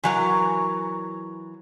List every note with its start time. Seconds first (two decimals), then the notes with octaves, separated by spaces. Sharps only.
0.04 E3 F#3 A#4